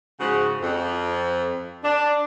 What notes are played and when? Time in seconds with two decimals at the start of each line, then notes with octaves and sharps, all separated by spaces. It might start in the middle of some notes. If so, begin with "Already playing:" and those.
0.20 G#2 C#3 F3 F#4 G#4 F#5
0.62 F2
1.84 D4